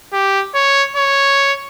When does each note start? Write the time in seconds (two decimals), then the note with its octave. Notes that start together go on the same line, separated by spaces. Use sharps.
0.13 G4
0.55 C#5
0.96 C#5